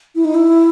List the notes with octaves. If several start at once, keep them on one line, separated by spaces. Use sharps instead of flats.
E4
D#4
E4